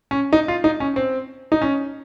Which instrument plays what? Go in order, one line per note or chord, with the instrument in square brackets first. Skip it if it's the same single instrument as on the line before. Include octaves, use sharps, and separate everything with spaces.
[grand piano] C#4
D#4
F4
D#4
C#4
C4
D#4
C#4